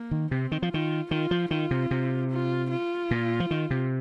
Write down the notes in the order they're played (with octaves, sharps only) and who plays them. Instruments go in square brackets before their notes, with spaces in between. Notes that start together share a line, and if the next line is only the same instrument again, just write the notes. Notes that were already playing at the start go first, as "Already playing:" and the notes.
Already playing: [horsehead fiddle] A#3
[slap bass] D#3
[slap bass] C3 [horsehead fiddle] C4
[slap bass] D#3
F3
[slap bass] D#3 [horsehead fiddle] F4
[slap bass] D#3 [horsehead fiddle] F4
[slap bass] F3
[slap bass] D#3 [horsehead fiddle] F4
[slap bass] C3
C3
[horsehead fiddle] F4
F4
[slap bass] A#2
F3
D#3
C3